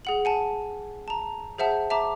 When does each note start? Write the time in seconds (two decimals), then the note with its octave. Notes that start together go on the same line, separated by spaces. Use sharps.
0.05 G#4 F#5 F#7
0.25 F#5 G#5 A5
1.08 A5 A#5
1.58 G#4 C5 E5 F#5 A5
1.90 E5 A5 A#5 D6